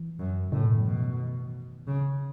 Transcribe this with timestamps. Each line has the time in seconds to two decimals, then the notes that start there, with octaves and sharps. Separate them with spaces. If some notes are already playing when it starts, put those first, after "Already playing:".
Already playing: E3
0.19 F#2
0.47 B2
0.52 A2 C#3
0.64 B2
0.75 D#3
0.81 F#3
0.86 B2 E3
1.19 D#3
1.87 C#3 F#3
1.98 E3
2.09 D#3